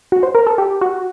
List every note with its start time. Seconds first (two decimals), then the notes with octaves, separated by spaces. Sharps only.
0.12 F#4
0.23 C5
0.35 A#4
0.47 A4
0.58 G4
0.81 F#4